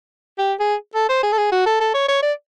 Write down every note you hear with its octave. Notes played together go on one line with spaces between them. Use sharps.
G4
G#4
A4
C5
G#4
A4
G#4
F#4
A4
A4
C#5
C#5
D5